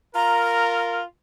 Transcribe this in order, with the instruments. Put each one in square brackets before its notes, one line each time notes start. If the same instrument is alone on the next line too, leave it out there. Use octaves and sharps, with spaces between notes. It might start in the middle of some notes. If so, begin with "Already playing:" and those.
[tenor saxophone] F4 [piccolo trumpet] A#4 [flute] A#5